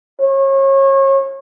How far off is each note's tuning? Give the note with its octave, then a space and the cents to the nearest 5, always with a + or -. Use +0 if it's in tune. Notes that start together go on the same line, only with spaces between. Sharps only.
C#5 -35